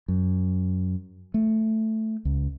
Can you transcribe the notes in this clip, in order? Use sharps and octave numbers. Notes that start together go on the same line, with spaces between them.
F#2
A3
C#2